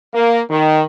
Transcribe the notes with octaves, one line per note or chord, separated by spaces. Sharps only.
A#3
D#3